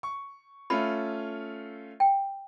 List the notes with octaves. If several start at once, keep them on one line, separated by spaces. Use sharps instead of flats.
C#6
A3 C#4 F4 B5
G5